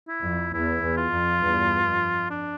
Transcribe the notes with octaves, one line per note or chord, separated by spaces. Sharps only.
E4
F2
E2 E4
E2
F4
F2
E2 G2
F2
D4